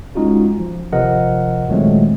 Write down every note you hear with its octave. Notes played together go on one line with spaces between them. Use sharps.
G#3 C#4 D#4 F4 F#4
F3
G#1 C3 F3 A#4 D#5 F#5
A#2 D#3 F#3 G#3 A3 C4